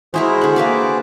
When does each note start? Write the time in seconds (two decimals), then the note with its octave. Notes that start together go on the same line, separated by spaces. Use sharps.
0.14 G#3 E4 F#4 G#4 A#4 C5
0.41 D3 F#5
0.56 A#3 B4 D5